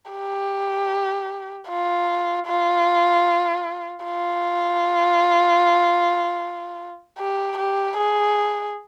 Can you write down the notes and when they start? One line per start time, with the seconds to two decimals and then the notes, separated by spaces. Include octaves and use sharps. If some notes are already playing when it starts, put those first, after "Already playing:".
0.12 G4
1.69 F4
2.47 F4
4.04 F4
7.19 G4
7.58 G4
7.97 G#4